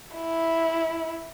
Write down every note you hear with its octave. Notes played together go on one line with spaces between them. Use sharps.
E4